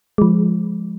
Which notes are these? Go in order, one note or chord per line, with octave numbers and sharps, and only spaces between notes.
F3 G#3